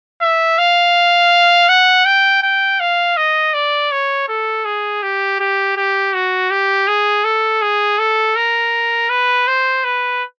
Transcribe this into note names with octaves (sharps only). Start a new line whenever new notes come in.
E5
F5
F#5
G5
G5
F5
D#5
D5
C#5
A4
G#4
G4
G4
G4
F#4
G4
G#4
A4
G#4
A4
A#4
B4
C5
B4